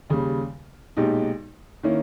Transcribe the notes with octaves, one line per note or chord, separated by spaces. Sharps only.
D#2 C#3 G3
B1 A#2 G#3 D#4 G4
D#3 A#3 C#4 E4